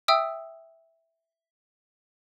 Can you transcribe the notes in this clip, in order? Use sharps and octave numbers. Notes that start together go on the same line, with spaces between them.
E5 G5 D#6 E6